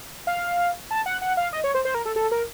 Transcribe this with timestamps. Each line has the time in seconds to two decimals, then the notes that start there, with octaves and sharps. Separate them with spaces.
0.27 F5
0.91 A5
1.06 F#5
1.22 F#5
1.37 F5
1.53 D#5
1.64 C#5
1.75 C5
1.85 C5
1.94 A#4
2.05 A4
2.16 A4
2.32 A#4